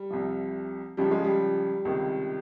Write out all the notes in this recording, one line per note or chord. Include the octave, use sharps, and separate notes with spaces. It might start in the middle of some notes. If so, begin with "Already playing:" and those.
Already playing: G3
C2 C3 F3
C#2 C#3 F3 G3
G#3
G3
C#2 C3 D#3